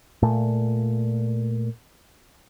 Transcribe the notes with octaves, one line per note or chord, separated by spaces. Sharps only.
A#2 A3